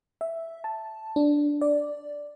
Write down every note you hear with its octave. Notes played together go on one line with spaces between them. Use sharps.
E5
A5
D4
D5